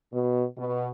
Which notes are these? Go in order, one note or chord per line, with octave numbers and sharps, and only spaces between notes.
B2
B2